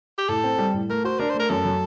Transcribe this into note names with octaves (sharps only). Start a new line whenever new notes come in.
G4
A2 A4
C4
G3
A2
A3 A#4
F#4 C5
D4 A#4
C5
A3
A#4
F#2 A4
F#3